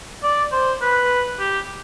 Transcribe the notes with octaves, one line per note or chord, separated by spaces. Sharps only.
D5
C5
B4
G4